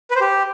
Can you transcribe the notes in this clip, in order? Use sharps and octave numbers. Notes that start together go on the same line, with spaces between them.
B4
C5
G4